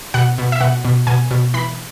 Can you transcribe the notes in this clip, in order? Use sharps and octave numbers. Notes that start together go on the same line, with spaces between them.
B2 F#5
B2
E5
B2 F#5
B2
B2 G#5
B2
E3 B5